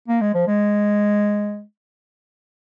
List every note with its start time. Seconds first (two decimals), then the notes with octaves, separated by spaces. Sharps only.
0.08 A#3
0.21 G#3
0.34 F3
0.47 G#3